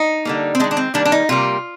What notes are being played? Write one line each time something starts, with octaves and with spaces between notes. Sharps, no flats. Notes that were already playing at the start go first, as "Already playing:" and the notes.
Already playing: D#4
D3 G3 A#3
C4
D#3 G#3 D4
D4
C4
D#3 G3 A#3 D4
D4
D#4
C3 G3 A#3 F4